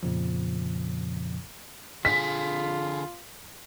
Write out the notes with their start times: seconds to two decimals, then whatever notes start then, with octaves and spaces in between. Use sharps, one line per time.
0.03 F2 A#2 C#3 F3
2.05 D3 F4 G#4 B6